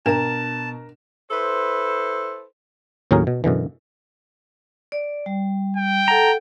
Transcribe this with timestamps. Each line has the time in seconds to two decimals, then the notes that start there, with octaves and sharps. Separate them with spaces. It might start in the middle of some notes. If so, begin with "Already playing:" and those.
0.06 B2 D4 A#4 A5 A#5 E7
1.31 E4 A4 B4 C5
3.11 D#2 A2 F#3 C#4 G#4 A#4
3.27 B2
3.44 F#2 B2 D3 E3
4.92 D5
5.26 G3
5.76 G5
6.08 A4 F#5 A5 A#5